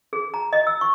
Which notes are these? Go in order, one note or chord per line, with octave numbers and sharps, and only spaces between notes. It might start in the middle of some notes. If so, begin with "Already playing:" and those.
G#4
A#5
D#5
E6
C#6